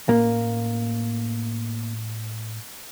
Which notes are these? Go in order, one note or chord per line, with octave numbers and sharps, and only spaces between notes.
A2 A#3 C#4